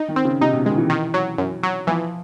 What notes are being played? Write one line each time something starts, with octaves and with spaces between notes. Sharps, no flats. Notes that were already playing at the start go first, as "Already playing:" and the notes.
Already playing: D#4
D#3
C4
C#3
C3 D#4
B2
D#3 G#3
E3
D#3
F#3
F#2
F#3
E3 F3